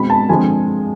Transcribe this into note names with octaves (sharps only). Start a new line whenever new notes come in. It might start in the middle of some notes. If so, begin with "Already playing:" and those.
Already playing: B2 G#3 C4 B5
A5
D3 F3 G#3 C4 G#5